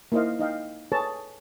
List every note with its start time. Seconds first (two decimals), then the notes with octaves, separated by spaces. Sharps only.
0.12 A#3 D#4 E4 C5 D#5 F5
0.39 D#4 D#5 F5 G5
0.92 G#4 A4 B4 C#5 A5